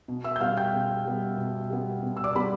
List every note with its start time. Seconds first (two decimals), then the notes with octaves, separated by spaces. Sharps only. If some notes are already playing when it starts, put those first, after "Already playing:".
0.08 B2
0.24 E5 E6
0.36 G6
0.40 G3 B3 F5 F6
0.57 G5 G6
0.73 B2
1.05 G3 B3
1.37 B2
1.70 G3 B3
2.03 B2
2.17 E6
2.24 D5 D6
2.35 G3 B3 B5